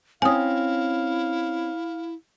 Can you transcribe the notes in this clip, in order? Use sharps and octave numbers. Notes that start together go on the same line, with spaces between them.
C4 C#4 E4 F5 G#5 D#6